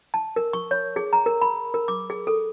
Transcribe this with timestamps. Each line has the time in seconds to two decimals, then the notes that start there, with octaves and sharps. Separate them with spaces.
0.14 A5
0.36 A#4
0.53 C#6
0.71 C#5
0.96 G#4
1.13 A#5
1.26 A#4
1.42 B5
1.74 A#4
1.88 D6
2.10 G#4
2.27 A4